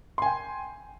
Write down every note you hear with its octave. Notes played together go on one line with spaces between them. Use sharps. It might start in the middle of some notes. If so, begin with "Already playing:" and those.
G5 G#5 C6